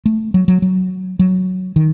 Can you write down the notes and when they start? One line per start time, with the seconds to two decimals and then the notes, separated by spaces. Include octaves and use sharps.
0.06 A3
0.34 F#3
0.48 F#3
0.62 F#3
1.19 F#3
1.76 D#3